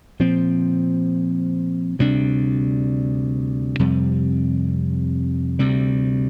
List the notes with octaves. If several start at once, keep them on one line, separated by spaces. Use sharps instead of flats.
A#2 F3 C4
D2 C3 G3 D4
F2 C3 G3
D2 C3 G3